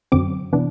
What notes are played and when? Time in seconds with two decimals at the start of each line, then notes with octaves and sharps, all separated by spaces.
0.12 F#2 D3 F#3 C4 D6
0.53 C3 E3 B3 D4